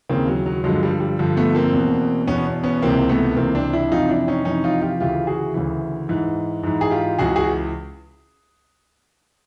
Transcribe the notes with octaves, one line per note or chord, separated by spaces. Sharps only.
D#2 C#3 E3 A#3 C4
F#3
F#3
G2 D3 F3 F#3 G#3
G3
G3
G2 D3 F3
A3 B3
A#3 C4
E2 B2
E2 B2 B3 C#4
B3 C#4
C#2 C3 E3 A#3 C4
A3 B3
C#2 C3 E3 A#3 C4
C4 D4
D4 E4
F2 C3 E3 D#4 F4
D4 E4
C#4 D#4
F2 C3 E3 C#4 D#4
D#4 F4
F4 G4
D2 C#3 E3 F4 G4
F#4 G#4
D2 C#3 E3
G#2 E3
G#2 E3
G#4
F4 G4
C#2 C#3 E3 F#4 G#4
F#4 G#4